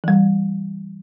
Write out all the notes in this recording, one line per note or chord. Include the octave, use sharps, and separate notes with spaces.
E3 G3